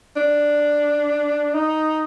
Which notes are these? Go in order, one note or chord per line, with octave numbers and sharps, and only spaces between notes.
D4
D#4